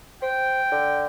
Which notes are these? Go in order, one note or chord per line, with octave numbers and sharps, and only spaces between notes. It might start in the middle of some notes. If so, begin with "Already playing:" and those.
C5 G5
D3